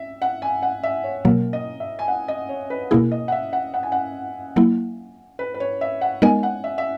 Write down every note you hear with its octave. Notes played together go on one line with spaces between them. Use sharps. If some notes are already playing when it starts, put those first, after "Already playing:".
Already playing: E5
F#5
G#5
F#5
E5
C#5
B2 F#3 A#3 A#4
D#5
E5
G#5
F#5
D#5
C#5
B4
B2 A#3 E4 G#4 A#4
D#5
F#5
E5
F#5
F#5
G#5
F#5
F#3 A#3 E4
B4
B4
C#5
E5
F#5
G#3 B3 D#4 A#4 D#5 G#5
F#5
E5
E5